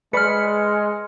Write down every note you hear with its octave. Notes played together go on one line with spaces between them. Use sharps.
G#3 B4 D5 B5 F6 C#7